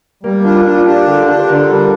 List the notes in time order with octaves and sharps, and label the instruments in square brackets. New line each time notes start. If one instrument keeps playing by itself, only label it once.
[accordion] G3 [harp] A#3
[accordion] D4 [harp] F4
[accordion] D4 [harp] F4
[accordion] D4 [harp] G4
[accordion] D3 [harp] G4
[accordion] D4 [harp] A4
[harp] C5
[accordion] D3 [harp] A#4
[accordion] G3 [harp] A4